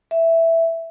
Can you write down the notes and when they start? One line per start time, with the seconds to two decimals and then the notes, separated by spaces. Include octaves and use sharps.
0.11 E5